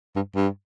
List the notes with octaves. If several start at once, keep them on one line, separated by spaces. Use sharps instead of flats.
G2
G2